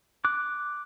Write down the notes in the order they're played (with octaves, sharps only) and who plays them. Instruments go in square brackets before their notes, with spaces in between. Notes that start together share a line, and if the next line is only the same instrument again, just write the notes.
[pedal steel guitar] D6 F#6